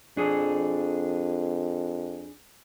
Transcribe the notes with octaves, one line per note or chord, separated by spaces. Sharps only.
F2 D4 G#4